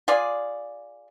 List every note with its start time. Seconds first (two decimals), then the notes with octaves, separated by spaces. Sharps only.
0.08 F4 G#4 D5